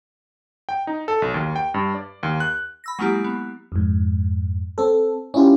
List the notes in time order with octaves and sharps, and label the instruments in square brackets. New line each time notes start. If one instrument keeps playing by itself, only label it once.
[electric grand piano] G5
D#4
A4
B1
D#2
G5
G2
D5
D#2
F#6
[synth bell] B5 E6 A#6
F#3 G#3 A#3 E4 G4
B3
[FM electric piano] F2 G#2
C4 A4
C#4 D4 E4 F4 G4